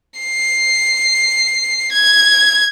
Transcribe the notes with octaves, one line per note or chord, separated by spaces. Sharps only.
C7
G#6